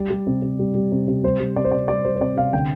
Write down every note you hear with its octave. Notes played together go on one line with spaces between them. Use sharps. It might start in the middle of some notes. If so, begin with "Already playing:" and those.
Already playing: G3 D5
G3
C3
C3
G3
G3
C3
C3
G3 C5
G3
C3 D5
C5
C3 D5
G3 D5
G3 C5
C5
C3 D5
C3 F5
D3 G5